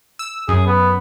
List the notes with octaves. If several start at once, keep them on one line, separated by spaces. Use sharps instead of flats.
E6
F#2 G#4
B3